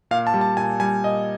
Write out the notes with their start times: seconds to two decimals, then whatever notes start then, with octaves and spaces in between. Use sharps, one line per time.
0.11 A#2 F5
0.27 A5
0.34 G3
0.41 A5
0.57 A#2 G#5
0.80 G3 G#5
1.04 A#2 D#5